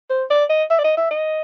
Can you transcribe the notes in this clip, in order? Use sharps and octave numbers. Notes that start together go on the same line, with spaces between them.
C5
D5
D#5
E5
D5
D#5
E5
D#5